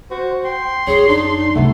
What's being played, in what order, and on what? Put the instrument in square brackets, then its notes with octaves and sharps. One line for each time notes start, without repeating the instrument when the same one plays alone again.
[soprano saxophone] F#4 [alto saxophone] C5
[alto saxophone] G5 [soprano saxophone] C6
[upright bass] F#2 [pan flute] G#4 [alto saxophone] C#5
[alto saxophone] D4 [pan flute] D#4
[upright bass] C3 F#3 [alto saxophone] A3 [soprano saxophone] B3